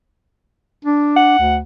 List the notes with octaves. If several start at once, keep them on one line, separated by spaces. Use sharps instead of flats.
D4
F#5
D2